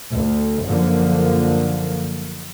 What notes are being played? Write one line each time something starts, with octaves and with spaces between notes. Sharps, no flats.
D2
F#2 D3 F3 A#3